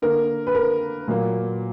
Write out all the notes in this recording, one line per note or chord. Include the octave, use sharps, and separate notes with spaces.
D3 A#3 A#4
B4
A#4
A#2 F#3 A#3